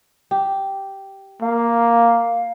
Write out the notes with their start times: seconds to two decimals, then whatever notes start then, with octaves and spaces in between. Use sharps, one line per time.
0.31 G4
1.42 A#3 F5